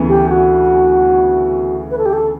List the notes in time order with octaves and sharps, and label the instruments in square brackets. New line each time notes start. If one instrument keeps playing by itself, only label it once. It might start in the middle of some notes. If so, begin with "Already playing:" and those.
Already playing: [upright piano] D2 C#3 E3 B3
[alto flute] G4
F#4
B4
A4
G4
A4